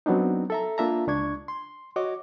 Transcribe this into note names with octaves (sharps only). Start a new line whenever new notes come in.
F#3 B3 C4 D4 D#4
A4 E5 A#5
A#3 D4 F4 E5 A5 A#5
C#2 D4 C#6 G#6
C6
F#4 C#5 D#5 D6